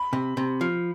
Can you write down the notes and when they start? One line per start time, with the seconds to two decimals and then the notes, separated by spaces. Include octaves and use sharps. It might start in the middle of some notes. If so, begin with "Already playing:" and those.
Already playing: B5
0.13 C3
0.37 C3
0.61 F3